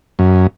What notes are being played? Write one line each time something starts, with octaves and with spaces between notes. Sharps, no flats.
F#2